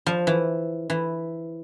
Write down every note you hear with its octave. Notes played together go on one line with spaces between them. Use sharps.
F3
E3
E3